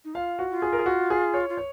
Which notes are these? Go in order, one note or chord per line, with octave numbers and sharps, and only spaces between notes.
D#4
F4 F5
F#4
F4
G#4
A#4
G#4
F#4
G#4
C#5
F4
C#5